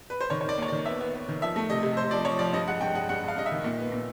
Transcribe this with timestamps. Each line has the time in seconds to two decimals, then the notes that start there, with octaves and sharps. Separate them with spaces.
0.10 B4
0.21 C5
0.30 D#3 C#5
0.41 C#5
0.44 D#3 D5
0.58 D#2 C#5
0.68 D5
0.72 D#3
0.86 B3 E5
1.01 B3
1.14 B3
1.29 D#3
1.42 F3 E5
1.56 A3
1.70 C3 D#5
1.83 C3
1.97 C3 C5
2.11 F3 D5
2.25 F3 C#5
2.39 F3 D5
2.53 G2 D#5
2.67 G#3 F#5
2.81 G2 G5
2.95 G#3 F#5
3.09 G2 F#5
3.23 G2
3.28 F5
3.36 G2 D#5
3.46 E5
3.51 D#3
3.64 A#2
3.79 B3
3.92 A#2